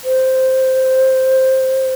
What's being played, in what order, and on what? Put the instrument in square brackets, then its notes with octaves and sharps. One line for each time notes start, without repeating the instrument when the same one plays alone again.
[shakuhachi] C5